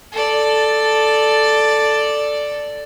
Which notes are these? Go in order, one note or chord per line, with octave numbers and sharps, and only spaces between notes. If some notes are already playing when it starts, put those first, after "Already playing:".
A4 D5